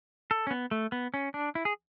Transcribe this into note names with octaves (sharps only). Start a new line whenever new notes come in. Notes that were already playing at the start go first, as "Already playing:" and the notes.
A4
C#4
B3
A3
B3
C#4
D4
E4
G#4